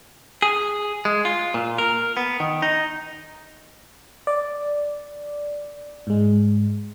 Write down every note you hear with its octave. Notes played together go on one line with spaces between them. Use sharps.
G#4
G#3
F4
A#2
A#4
B3
D#3
D#4
D5
G#2 G#3